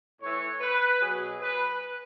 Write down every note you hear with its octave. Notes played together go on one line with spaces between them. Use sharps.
A2 E3 C#5
B4
B2 F#3 G#4
B4